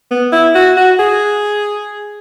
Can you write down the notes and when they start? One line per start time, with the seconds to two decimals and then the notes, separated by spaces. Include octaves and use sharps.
0.11 B3
0.32 E4
0.55 F#4
0.77 F#4
0.99 G#4